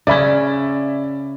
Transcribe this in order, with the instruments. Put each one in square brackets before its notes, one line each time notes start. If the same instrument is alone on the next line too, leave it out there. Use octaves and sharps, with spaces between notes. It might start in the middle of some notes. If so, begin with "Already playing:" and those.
[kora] C#3 C#4 [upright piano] D5 E5 B5